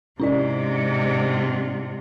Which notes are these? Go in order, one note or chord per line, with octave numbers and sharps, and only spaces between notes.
G#2 C3 C#4 E4 D5